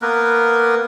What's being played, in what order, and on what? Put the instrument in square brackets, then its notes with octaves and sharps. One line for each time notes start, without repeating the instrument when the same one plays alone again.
[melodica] A#3 B3 A#4 B4